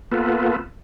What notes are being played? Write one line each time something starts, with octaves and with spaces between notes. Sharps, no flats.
A#3 B3 F4 A4 B4